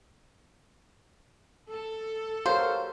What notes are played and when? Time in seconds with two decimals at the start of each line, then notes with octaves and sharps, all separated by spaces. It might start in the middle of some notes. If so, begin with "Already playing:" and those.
1.71 A4
2.46 F#4 G4 A#4 C5 C#5 F5